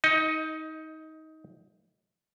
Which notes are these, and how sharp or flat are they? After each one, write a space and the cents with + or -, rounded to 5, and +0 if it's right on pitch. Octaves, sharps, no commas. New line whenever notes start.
D#4 +20 D#5 +0